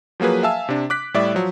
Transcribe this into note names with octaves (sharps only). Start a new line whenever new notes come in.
F3 F#3 A#3 G#4 B4
E5 F5 G#5 A5 E6
C3 D4
D6 F#6 B6
A2 G3 D5 E5 D6
F3 F#3